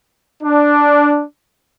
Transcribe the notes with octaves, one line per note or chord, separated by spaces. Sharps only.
D4